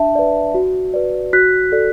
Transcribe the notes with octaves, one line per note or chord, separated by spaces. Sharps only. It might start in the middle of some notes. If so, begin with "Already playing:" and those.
Already playing: D4 E5 A5
B4 D5
F#4
B4 D5
F#4 F#6 B6
A4 D5